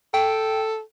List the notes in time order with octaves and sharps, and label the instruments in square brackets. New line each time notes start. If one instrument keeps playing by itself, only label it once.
[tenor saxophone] A4 [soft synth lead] G5